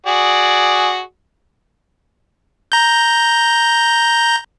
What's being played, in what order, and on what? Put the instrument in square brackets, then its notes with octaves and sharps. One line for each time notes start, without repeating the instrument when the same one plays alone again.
[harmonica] F#4 G#4 D5
[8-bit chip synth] A#5 G6